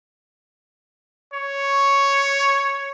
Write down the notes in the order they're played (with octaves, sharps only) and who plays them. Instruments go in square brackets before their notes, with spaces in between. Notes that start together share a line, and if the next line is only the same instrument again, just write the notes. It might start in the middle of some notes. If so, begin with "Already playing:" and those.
[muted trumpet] C#5 [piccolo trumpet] C#6